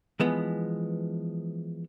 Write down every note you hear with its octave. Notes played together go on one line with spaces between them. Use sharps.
E3 F3 G#3 B3